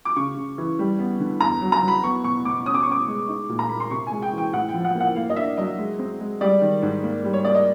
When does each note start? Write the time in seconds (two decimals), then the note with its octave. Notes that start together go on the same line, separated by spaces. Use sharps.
0.05 D6
0.16 C#3 C#6
0.37 C#3
0.58 E3
0.79 G3
0.99 B3
1.20 D3
1.41 E2 A#5
1.61 F#3
1.72 A#5
1.83 F#3
1.88 B5
2.04 B3 C#6
2.24 B2 C#6
2.45 B2 D6
2.66 C#4 D#6
2.74 D6
2.83 C#6
2.87 C#4 D6
3.08 G#3
3.28 D#4
3.49 A#2
3.59 A#5
3.69 A#3 B5
3.80 C6
3.91 C3 C#6
4.07 G#3 G#5
4.22 G5
4.33 E3 G5
4.53 A2 F#5
4.69 G5
4.74 F3
4.85 F#5
4.95 A#3
5.00 F#5
5.16 A#3 F5
5.30 D#5
5.36 D4 E5
5.57 F#3 D#5
5.78 G#3
5.99 C4
6.20 G#3
6.41 G3 D5
6.62 D#3
6.82 G#2
7.03 A#3
7.24 G3
7.33 C#5
7.44 A#3 D5
7.55 D#5